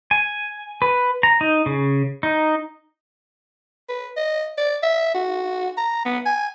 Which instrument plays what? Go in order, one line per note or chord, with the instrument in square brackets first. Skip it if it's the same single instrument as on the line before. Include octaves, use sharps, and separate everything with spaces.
[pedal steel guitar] G#5
B4
A#5
D#4
C#3
D#4
[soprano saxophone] B4
D#5
D5
E5
F#4
A#5
B3
G#5